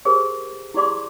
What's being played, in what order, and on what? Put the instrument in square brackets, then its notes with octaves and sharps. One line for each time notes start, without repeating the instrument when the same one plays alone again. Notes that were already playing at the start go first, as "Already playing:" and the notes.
[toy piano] G4 G#4 A#4 C5
E4 G4 G#4 D5 C6 D6